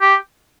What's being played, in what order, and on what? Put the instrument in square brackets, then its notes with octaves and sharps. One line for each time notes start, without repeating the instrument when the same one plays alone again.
[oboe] G4